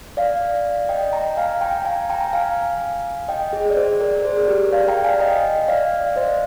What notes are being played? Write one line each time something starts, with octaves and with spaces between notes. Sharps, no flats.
D5 F5
D#5 G5
G5 A#5
F5 G#5
G5 A#5
F5 G#5
G5 A#5
A#5
F5 G#5
D#5 G5
G#4
D5
G#4 C5
A#4 D5
A#4
G#4 C5
G4 A#4
D5 F5
G5 A#5
F5 G#5
D#5 G5
D5 F5
F5
C5 D#5